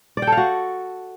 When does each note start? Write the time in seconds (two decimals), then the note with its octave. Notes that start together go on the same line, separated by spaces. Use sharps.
0.17 D5
0.22 G5
0.27 A4
0.32 F5
0.37 F#4